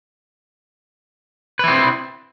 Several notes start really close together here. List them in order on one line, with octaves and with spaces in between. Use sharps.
B4 E4 C4